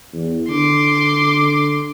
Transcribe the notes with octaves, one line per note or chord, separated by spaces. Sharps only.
E2
D3 C6 D6